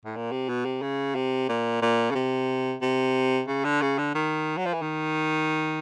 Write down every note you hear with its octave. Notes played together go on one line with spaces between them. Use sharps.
A2
A#2
C3
B2
C3
C#3
C3
A#2
A#2
C#3
C3
C3
C#3
D3
C#3
D3
D#3
F#3
F3
E3
D#3